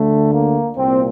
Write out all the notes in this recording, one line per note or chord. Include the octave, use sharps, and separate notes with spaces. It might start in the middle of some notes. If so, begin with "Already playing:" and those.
Already playing: D2 D3 A3
A#3
C2 A#2 C4